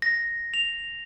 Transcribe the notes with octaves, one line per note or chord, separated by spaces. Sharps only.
A#6
F7